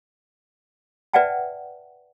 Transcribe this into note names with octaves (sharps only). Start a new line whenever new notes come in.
B4 D5 E5 F#5 G5 A5